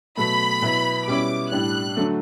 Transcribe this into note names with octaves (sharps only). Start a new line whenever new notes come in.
B2 F#3 A3 B5
B2 F#3 B3 E4
B2 G3 C#4 E4 D6
A2 G3 D4 F#6
D3 F#3 A3